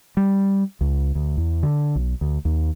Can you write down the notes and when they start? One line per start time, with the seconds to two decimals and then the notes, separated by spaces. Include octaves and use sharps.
0.17 G3
0.81 C#2
1.15 D2
1.37 E2
1.63 D3
1.96 B1
2.21 D2
2.45 D#2